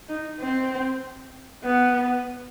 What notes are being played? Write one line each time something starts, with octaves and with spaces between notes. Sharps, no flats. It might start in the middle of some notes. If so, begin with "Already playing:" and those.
D#4
C4
B3